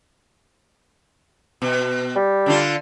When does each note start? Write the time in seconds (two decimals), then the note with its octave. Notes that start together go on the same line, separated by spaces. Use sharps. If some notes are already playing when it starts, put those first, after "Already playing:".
1.62 B2
2.16 G3
2.46 D3 D4 F4